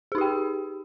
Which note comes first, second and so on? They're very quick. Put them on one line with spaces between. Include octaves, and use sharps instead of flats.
G#4 D#4 G4 G5